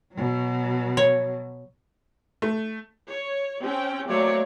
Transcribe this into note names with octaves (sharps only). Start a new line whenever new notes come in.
B2 F#3
C#5
A3
C#5
C4 C#4 G5
F#3 A3 A#3 C4 C#5 D5